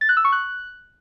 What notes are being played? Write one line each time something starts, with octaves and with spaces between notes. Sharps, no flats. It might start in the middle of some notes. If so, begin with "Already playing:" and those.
A6
F#6
E6
C#6
F#6